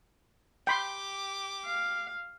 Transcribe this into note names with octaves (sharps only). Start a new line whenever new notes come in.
G4 G5 B5 C6 D6
F5